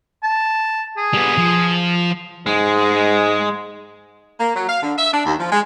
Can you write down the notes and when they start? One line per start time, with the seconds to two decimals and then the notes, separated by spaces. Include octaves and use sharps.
0.23 A5
0.97 G#4
1.13 G3 B3
1.38 F3
2.47 G#2 G#3
4.39 A#3
4.54 F#3
4.68 F5
4.81 D3
4.97 E5
5.12 D4
5.25 D#2
5.39 F3
5.51 G#3